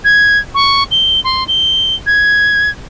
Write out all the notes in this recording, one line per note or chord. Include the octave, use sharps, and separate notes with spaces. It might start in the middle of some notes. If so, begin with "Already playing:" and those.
G#6
C#6
G7
C6
G7
G#6